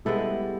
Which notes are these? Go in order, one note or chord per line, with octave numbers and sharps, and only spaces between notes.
G3 G#3 B3 E4 G4 A4